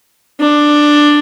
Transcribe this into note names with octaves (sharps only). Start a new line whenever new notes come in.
D4